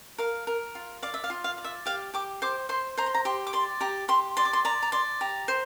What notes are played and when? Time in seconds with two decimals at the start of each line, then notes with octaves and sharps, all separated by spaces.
0.18 A#4 F5
0.47 A#4
0.75 F4
1.02 D5 F5
1.14 E5
1.24 F5
1.30 F4
1.44 F5
1.58 D5
1.64 E5
1.86 G4 F5
2.14 G4 D6
2.42 C5 D6
2.69 C5 C6
2.98 C5 A#5
3.06 C6
3.15 A#5
3.25 G4 C6
3.47 D6
3.53 D5 C6
3.81 G4 A#5
4.08 G4 C6
4.37 D5 C6
4.45 D6
4.53 C6
4.65 D5 A#5
4.82 A#5
4.92 D5 C6
5.21 G4 A#5
5.48 C5